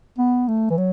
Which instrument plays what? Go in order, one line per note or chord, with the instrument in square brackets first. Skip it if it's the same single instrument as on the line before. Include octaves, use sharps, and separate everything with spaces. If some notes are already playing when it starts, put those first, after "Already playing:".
[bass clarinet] B3
A3
E3
F#3